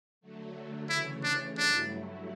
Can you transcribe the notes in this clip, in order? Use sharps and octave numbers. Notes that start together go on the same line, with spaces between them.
D3 F#3 A3
C#3 E3 A3 C#4 E4
D4
G2 F#3 A3 D4 E4